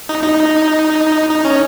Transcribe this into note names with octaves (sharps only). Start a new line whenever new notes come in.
D#4
D#4
D#4
C#4